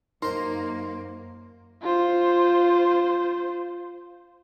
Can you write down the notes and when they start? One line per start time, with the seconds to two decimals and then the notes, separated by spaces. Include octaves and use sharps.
0.22 F#2 A#3 D#4 A#4 C5 C6
1.82 F4 C5